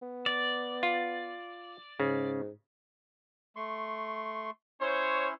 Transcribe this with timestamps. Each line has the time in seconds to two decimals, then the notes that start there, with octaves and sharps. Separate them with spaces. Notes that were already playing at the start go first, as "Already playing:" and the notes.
0.02 B3
0.26 D5
0.83 F4
2.00 G#2 C#3
3.56 A3 C6 C#6
4.81 C#4 E4 C5 C#5 C6